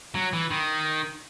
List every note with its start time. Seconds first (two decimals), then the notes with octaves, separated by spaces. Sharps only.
0.15 F#3
0.33 E3
0.51 D#3